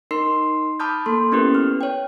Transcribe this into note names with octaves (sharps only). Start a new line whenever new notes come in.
D#4 A#4 C6 C7
A5 B5 D6 D#6 F6 G6
A#3 A4 C6
B3 C#4 E4 G4 A#4 B4
F6
C#5 G5